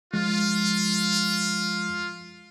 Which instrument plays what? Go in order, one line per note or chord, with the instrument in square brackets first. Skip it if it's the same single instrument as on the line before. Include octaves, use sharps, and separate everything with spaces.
[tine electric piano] F3 G#3 [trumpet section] F4